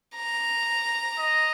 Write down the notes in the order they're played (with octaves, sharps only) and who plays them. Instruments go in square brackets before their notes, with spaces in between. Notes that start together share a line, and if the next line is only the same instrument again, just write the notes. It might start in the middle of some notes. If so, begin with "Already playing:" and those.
[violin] A#5
[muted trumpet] D#5